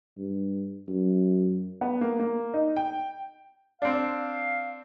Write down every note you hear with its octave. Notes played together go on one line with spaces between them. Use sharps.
G2
F#2
B3
A#3
A#3
D#4
G5
C4 D4 F5